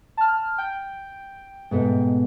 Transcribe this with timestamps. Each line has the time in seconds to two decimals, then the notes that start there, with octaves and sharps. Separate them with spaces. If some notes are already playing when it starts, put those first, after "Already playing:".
0.17 A5 F6
0.58 G5
1.71 G#2 B2 A3